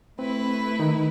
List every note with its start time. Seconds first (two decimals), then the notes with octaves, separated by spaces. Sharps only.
0.19 A3 C4 E4 B4
0.79 D#3 D#4